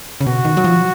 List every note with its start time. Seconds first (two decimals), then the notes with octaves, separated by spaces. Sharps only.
0.21 C#3
0.26 B2 F#4
0.45 D#3
0.57 F#3
0.64 F3